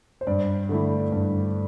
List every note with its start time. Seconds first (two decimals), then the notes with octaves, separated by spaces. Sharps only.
0.21 C5
0.27 G2 D5
0.69 D3 A3 E4
1.12 G2